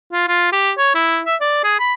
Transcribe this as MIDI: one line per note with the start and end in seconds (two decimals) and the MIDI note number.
0.13 0.26 65
0.28 0.52 65
0.52 0.72 67
0.78 0.94 73
0.95 1.21 64
1.26 1.36 76
1.41 1.60 74
1.64 1.76 68
1.79 1.94 83